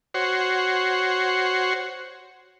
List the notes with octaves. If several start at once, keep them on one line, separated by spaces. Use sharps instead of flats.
F#4 C5 C#5